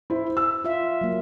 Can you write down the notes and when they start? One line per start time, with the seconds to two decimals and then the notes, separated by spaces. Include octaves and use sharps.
0.10 E4 C5
0.37 E6
0.64 F4 E5
1.01 F#3 A#3